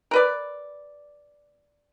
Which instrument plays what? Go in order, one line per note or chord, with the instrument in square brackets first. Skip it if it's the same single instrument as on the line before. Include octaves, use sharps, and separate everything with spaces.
[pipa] A#4 B4 D5